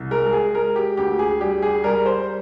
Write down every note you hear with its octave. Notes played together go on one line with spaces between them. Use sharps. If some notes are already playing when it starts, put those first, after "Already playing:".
Already playing: C2
G#3 A#4
G#4
G#3 A#4
G4
D2 G4
G#4
G3 G4
G#4
G3 A#4
C5